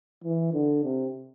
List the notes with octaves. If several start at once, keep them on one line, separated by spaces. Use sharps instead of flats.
E3
D3
C3